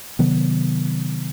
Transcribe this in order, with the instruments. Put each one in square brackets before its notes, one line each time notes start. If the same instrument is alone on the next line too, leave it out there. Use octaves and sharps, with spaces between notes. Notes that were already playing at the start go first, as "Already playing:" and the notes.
[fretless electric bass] C3 D#3 F#3 B3